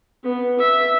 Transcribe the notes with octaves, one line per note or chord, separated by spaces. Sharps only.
B3
E5